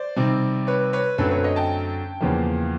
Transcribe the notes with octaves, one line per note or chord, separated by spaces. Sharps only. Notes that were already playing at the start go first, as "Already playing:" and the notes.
Already playing: C5 D5
C3 D#3 G3 C4
B4 C#5
B4 C#5
F#2 D3 F#3 A3 C4 A4 B4
B4 C#5
C#5 D#5
G5 A5
E2 C#3 F3 A#3